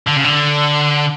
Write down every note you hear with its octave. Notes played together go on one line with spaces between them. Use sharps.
D3
C#3
D3